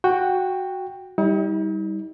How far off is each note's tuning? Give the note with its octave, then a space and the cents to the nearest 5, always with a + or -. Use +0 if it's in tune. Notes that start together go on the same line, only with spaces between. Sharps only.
F#4 +0 G5 +10
G3 +0 D#4 +45